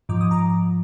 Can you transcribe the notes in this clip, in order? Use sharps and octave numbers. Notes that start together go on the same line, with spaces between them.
G#2 F3 D6
D#6
A#5 D6